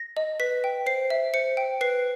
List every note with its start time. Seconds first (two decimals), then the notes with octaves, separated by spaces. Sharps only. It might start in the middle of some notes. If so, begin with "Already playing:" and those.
Already playing: A#6
0.17 D#5
0.40 B4 B6
0.64 G5
0.86 C5 C7
1.10 E5
1.34 C5 C#7
1.57 G5
1.81 B4 C7